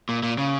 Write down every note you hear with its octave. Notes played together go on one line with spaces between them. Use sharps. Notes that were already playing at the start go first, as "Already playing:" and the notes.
A#2
A#2
C#3